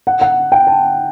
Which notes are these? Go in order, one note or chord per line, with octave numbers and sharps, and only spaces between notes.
F#5
F#5
G5
A5